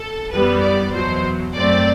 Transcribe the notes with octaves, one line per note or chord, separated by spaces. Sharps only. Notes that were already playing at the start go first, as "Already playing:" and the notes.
Already playing: A4
F#2 E3 G3 B3 B4
D5
E2 B2 F#3 C5
F#2 F#3 A3 C4 D5